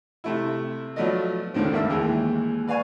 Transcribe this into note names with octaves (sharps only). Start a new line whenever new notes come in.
C3 A3 E4
F3 F#3 A3 B3 D5 D#5
C#2 A2 D3 D#3 C4
G2 A#3 E5 E6
D#2 E3 G#3
B4 D5 F5 G#5 C#6